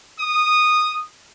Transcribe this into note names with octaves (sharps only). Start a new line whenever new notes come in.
D#6